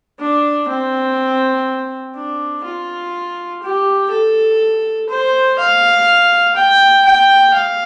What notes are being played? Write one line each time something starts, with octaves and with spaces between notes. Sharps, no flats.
D4
C4
D4
F4
G4
A4
C5
F5
G5
G5
F5